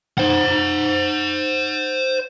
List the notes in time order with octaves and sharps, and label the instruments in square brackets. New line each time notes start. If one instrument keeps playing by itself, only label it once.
[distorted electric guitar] C5 F#5